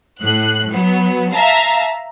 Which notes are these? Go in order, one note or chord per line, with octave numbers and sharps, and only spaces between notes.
A2 F#6
F#3 B3
E5 F5 A5 A#5